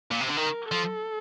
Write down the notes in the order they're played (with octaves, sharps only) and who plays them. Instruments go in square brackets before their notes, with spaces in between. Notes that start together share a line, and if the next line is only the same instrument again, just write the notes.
[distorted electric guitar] A#2
C3
D3
[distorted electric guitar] D#3 [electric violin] A#4
[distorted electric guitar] F3 [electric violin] A4